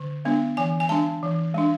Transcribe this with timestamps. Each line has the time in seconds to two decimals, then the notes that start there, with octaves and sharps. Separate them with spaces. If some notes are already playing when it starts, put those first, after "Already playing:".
Already playing: D3
0.25 G#3 B3 D4
0.57 E3 G#5
0.80 G#5
0.89 G#3 D4 A5
1.23 E3
1.55 G#3 D4